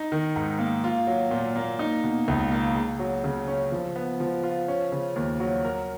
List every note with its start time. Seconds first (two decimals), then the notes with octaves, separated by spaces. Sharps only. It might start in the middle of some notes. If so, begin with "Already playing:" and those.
Already playing: D#4
0.12 D#3
0.36 G#2
0.59 A#3
0.84 F4
1.07 F#3
1.31 A#2
1.56 A#3
1.79 D#4
2.04 B2
2.28 C#2
2.52 A#3
2.75 G#4
2.99 F#3
3.24 C#3
3.48 C#4
3.72 F3
3.96 B3
4.20 F3
4.43 F4
4.68 C#4
4.92 C#3
5.16 D#2
5.40 F#3
5.65 A#4